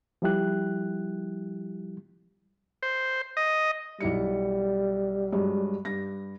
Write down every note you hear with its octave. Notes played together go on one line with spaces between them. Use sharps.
F3 G3 E4 G4 F#6
C5
D#5
B1 G3 E4 C#7
G2 F#3 G#3
G2 A#6